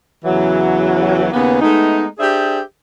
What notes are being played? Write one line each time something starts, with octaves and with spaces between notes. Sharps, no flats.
E2 C#3 E3 F#3
D#2 C#3 A#3 B3
G#3 A3 B3 D#4
D4 G4 G#4 C5 D5 E5